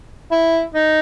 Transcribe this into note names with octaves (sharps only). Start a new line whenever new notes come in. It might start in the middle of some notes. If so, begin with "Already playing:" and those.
E4
D#4